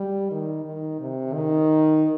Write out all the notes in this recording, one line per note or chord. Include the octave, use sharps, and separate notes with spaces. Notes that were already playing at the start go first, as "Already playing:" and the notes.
Already playing: G3
D#3
D#3
C3
D#3